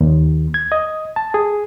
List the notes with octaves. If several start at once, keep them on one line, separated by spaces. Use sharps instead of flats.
D#2
G#6
D#5
A5
G#4